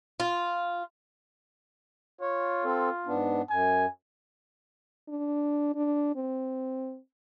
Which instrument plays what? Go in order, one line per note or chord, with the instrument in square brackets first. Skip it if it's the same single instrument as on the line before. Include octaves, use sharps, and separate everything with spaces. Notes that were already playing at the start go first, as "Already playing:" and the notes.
[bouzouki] F4
[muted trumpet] F4 [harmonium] C#5
[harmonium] C4 A4
G#2 B3 D4
[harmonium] F#2 [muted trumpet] G#5
[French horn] D4
D4
C4